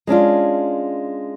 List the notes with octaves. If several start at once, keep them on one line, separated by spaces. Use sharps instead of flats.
G#3 C#4 D4 F4